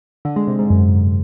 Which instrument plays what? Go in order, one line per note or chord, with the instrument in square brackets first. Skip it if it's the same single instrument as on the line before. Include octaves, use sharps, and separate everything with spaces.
[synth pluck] D3
G#3
C3
G#2
F#2